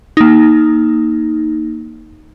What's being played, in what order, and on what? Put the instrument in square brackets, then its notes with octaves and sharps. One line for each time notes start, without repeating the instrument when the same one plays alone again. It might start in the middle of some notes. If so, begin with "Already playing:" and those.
[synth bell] A#3 D#4